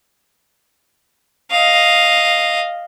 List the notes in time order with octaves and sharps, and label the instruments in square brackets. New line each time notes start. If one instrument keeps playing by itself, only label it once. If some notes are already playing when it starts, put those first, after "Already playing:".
[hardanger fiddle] D#5 F5